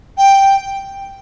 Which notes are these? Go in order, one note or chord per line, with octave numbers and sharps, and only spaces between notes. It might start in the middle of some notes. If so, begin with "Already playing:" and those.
G5